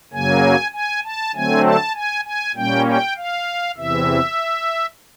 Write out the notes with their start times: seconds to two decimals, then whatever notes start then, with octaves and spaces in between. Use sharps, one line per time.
0.13 F#2 C#3 F#3 A#3 G#5
0.73 G#5
1.04 A5
1.34 D3 F#3 A3 C4 G#5
1.65 A5
1.95 G#5
2.25 G#5
2.55 A#2 G3 A#3 C#4 G5
2.86 G5
3.17 F5
3.77 E2 C3 E3 E5